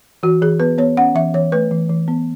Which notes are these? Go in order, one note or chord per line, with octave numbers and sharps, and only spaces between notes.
E3 F#4
E3 G#4
B3 B4
B3 C#5
C#4 F#5
E3 E5
E3 C#5
A3 B4
E3
E3
B3